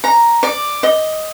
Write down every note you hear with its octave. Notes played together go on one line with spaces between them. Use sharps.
A#5
D5
D#5